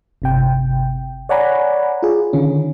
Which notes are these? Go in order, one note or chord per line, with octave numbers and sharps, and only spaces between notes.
G1 C3 G5
C#5 D5 F#5 G#5 A#5 B5
F4 G#4
D3 D#3 C#4